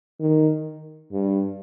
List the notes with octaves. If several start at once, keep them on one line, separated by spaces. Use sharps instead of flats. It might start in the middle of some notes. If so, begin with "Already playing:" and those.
D#3
G2